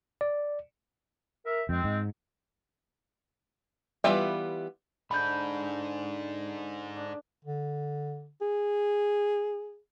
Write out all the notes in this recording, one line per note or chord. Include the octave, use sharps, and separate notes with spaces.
D5
A#4 E5
F2 G#3 C4
G#2
E3 G3 B3 F4 E5
D3 D#4 G#4 E5 A5 B5 G6
D4
D3
G#4